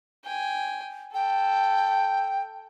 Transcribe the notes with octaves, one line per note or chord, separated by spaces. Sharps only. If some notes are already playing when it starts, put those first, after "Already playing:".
G5 G#5
A4 G5